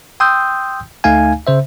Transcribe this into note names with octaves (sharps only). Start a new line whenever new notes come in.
G5 C6 D#6 E6 G6
D2 A3 D#4 F5 G#5
C#3 C5 E5